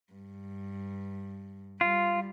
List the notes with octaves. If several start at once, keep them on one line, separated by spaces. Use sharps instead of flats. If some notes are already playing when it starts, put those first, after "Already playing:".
G2
G3 F4